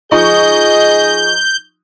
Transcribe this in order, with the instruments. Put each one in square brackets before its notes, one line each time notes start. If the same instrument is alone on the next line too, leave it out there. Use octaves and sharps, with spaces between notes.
[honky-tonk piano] F3 D#4 C#6 [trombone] G#4 [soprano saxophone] D#5 [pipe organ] G6